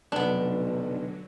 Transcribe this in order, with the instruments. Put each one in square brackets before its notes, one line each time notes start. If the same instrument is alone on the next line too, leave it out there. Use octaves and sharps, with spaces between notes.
[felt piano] F1 [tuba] B1 [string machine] D3 F#3 [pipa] B3 D4